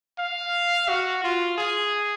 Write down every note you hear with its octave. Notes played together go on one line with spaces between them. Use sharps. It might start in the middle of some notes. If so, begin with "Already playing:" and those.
F5
F#4
F4
G#4